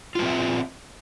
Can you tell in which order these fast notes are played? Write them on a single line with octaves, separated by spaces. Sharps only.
F4 B4 C4 E5